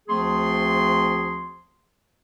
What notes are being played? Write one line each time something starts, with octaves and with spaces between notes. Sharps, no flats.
D2 F3 A3 C4 G#4 C6